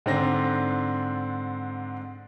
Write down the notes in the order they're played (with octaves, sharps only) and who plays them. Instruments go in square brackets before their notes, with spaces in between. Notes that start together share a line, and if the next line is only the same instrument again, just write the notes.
[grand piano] G#2 D3 C4 D4 A#6